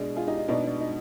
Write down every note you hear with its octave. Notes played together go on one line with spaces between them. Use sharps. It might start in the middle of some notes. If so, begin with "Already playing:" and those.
Already playing: B2 G#3 D4
F4 G#4
D#4 G4
D#4
B2 B3 D4 D#4
D4
D#4